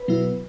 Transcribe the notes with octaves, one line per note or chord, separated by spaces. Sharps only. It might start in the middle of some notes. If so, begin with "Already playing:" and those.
Already playing: B4
B2 F#3 B3 E4